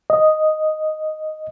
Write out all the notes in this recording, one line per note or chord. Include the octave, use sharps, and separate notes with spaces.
D#5